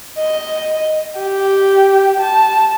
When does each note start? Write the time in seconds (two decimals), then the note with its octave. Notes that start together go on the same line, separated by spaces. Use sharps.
0.19 D#5
1.18 G4
2.20 A5